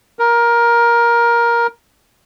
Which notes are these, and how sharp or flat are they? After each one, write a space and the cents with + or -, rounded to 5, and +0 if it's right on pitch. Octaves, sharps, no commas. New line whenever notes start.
A#4 +15